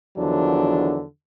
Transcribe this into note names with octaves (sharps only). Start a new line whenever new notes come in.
E2 D3 D#3 F3 F#3 D4